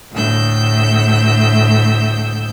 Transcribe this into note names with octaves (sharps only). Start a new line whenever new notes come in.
D2 A2 E6 G6